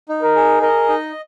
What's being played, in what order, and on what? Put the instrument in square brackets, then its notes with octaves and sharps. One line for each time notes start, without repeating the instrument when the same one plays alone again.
[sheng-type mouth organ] D#4
[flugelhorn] A#4
[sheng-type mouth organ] G#4
[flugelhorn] A#4 [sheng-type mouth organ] D#5
[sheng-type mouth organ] D#4